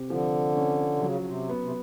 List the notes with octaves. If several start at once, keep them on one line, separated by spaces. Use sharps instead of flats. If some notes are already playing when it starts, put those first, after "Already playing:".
Already playing: C3
D3 F3
C#4
C3
C#3 F#3
C#3
C3
B3
C3